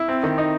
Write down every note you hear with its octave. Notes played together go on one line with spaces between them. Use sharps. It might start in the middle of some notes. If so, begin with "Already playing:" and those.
Already playing: E4
C4
D#3
D#4